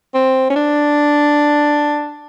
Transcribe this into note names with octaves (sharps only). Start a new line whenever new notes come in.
C4
C#4
D4